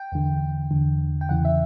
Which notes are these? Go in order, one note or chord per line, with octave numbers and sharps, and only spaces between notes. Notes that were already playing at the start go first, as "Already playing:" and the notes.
Already playing: G5
E2 D3
E2 D3
G5
E2 C#3 E3 F#5
E5